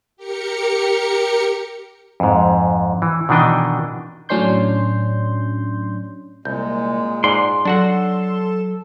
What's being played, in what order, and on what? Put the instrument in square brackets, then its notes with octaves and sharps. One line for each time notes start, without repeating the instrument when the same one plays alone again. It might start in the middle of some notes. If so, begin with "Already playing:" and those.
[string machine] G4 A#4 C#7
[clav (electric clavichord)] F2 G#2
E3
B2 D#3 E3 D4 D#5 G5
[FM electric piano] A2 F#3 C#4 D4 C6 G6
[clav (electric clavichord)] C2 [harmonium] A#2 G#3 [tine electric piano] G6
[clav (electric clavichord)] G#2 D5 [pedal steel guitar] C6
[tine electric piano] F#3 [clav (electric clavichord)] D4 F#4 F#5 [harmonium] A4